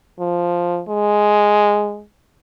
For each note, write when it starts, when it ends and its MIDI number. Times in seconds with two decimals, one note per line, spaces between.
0.20 0.81 53
0.88 2.02 56